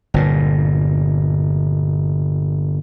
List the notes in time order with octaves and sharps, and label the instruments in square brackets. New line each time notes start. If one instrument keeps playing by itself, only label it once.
[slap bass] G1 A#2